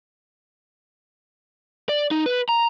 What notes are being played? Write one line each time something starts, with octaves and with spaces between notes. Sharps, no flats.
D5
D#4
B4
A#5